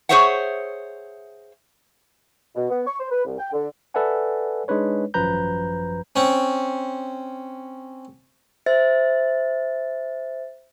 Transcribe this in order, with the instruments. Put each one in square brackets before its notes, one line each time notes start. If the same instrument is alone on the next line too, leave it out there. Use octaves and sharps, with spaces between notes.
[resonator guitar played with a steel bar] G#4 A4 C5 C#5 E5 F#5
[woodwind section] B2
B3
C#6
C5
B4
C2
G5
D3
[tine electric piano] A4 B4 D5 E5 F#5 G#5
G#3 D4 D#4 B4 C#5
G#1 F#2 F3 B4 A#5 G6
[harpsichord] C4 C#4
[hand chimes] C5 E5 A6